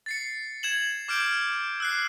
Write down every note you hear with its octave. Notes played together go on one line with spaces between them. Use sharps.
A6 C7 C#7
G#6 E7 F#7
D6 F6 G6 D7
F6
E6 F#6 C7